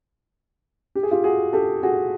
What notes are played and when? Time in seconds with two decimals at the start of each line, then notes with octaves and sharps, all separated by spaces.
0.95 G4
1.03 G#4
1.11 F4 G4
1.24 F#4 G#4
1.53 G4 A4
1.83 F#4 G#4